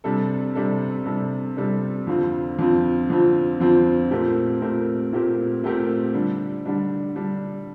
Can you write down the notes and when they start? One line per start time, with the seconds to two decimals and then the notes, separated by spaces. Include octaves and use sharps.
0.04 C3 G3 D4 A4
0.55 C3 G3 D4 A4
1.06 C3 G3 D4 A4
1.57 C3 G3 D4 A4
2.07 F2 D3 F3 C4 F4
2.59 F2 D3 F3 C4 F4
3.10 F2 D3 F3 C4 F4
3.61 F2 D3 F3 C4 F4
4.11 A#2 A3 C4 G4 A#4
4.62 A#2 A3 C4 G4 A#4
5.13 A#2 A3 C4 G4 A#4
5.63 A#2 A3 C4 G4 A#4
6.14 D3 G3 D4
6.66 D3 G3 D4
7.16 D3 G3 D4